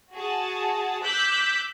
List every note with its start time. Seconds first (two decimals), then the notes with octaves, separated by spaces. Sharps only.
0.13 F#4 G#4 A5
1.03 D6 E6 F#6 G6 B6